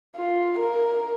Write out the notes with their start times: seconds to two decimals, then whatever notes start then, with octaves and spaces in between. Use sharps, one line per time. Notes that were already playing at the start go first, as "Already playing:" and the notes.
0.16 F4
0.59 A#4